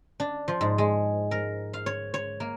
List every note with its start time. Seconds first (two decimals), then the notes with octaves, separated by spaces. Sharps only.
0.20 D4
0.48 F3
0.61 G#2
0.78 G#3
1.31 A#4
1.73 F5
1.86 C#5
2.14 C#5
2.40 A#3